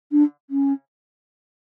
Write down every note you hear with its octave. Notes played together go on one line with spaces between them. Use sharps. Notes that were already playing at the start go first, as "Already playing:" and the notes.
D4
C#4